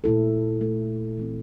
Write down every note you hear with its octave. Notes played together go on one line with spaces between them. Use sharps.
A#2 A3 E4 A4
A3 E4 A4
E3 A3 C4